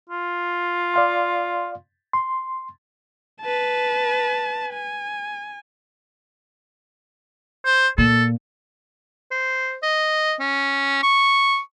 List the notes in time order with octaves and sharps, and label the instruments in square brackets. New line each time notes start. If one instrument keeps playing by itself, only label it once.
[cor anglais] F4
[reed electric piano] D5 F5 C6
C6
[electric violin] B4 A5
G#5
[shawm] C5
[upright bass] A#2 [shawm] A4
[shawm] C5
D#5
C#4
C#6